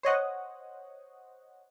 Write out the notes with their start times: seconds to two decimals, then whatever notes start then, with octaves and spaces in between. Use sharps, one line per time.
0.03 C5 C#5 D#5 F#5